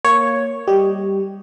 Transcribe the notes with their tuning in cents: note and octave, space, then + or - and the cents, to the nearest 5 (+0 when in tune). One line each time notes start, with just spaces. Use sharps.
A#3 +0 C#5 +0
G3 +0 G4 -10 D#5 +0